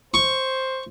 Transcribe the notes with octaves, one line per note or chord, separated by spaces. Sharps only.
C5 C#6